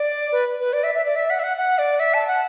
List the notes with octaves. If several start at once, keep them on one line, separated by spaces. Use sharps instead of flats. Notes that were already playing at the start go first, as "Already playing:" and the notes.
Already playing: D5
B4
B4
D5
E5
E5
D5
E5
F#5
E5
F#5
F#5
D5
E5
A5
F#5